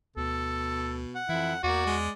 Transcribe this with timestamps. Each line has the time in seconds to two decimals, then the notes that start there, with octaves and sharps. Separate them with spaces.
0.17 D2 B2 A4
1.15 F#5
1.29 F2 E3 E4
1.63 E2 A#3 F#4 D5
1.86 G#3